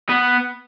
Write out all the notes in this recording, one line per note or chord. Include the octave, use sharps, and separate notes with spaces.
B3